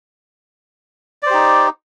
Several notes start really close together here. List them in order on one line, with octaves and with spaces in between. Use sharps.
D5 C5 G4 D#4